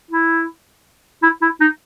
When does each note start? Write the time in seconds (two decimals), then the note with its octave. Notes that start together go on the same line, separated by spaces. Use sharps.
0.11 E4
1.22 E4
1.42 E4
1.60 D#4